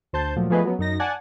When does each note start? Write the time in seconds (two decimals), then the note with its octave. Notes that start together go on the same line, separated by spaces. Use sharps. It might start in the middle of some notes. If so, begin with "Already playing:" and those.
0.13 D2 C5 A5 G6
0.36 A#2 F3 F#3 A3
0.50 F3 A3 B3 G#4 B4 D#5
0.65 F#3 B3 C#4
0.79 F#2 D#4 A#6
1.00 D5 F#5 G#5 A5